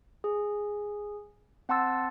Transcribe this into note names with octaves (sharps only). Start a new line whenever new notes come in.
G#4
C4 F#5 A5 C6 E6 A6